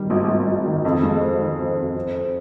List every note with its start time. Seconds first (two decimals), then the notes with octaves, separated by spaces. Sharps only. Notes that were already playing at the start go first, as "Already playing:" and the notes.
Already playing: D#3 G3
0.10 G#1
0.28 G#1
0.47 G#1
0.65 D#3
0.85 F2
1.03 G#3
1.21 C4
1.39 D#3
1.59 C4
1.77 F2
1.95 C4
2.14 C4